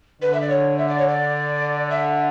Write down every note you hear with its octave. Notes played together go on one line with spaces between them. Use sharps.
D3 B4
E5
D5
C#5
E5
D5
C#5
D5
E5